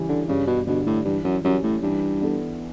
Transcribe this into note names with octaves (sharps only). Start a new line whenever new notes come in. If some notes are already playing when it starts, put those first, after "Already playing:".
Already playing: C#3 E3 G3
D3
G2 C#3
B2
B2 D3 G3 D4 G4
A2
G2 E3
F#2
F#2 G3 C#4
A2
G2 E3
B3 D4 A4